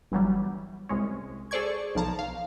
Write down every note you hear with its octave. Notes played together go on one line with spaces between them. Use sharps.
G1 E3 F#3 G3
C2 G#3 C#4
G#4 A4 C5 D5 C#6 G#6
B1 F3 A5 A#5
F5